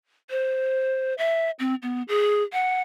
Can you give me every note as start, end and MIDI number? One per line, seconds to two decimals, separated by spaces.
0.30 1.14 72
1.18 1.50 76
1.59 1.75 60
1.82 2.03 59
2.08 2.43 68
2.53 2.82 78